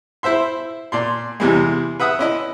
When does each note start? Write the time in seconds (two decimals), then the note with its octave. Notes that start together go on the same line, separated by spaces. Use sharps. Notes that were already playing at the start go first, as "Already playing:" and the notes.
0.23 E4 C5 E5 C6
0.92 A#2 D5 C6
1.40 E2 C3 E3 G3 G#3
2.00 B4 E5 F#5 D#6
2.19 C#4 E4 D#5